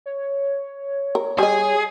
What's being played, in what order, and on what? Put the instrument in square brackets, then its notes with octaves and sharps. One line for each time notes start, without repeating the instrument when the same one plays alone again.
[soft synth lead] C#5
[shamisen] A#4
[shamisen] G3 D#5 [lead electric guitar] G#4